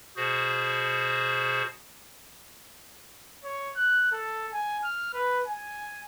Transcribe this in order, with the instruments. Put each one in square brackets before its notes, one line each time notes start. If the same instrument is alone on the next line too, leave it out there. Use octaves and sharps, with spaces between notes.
[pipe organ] B2 F#4 G#4 C5
[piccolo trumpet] C#5
F#6
A4
G#5
F6
B4
G#5